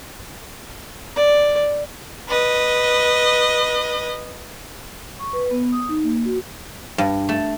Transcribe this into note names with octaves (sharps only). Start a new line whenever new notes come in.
D5
B4 D#5
C#6
B4
B3
D#6
D#4
A#3
F#4
G2
A3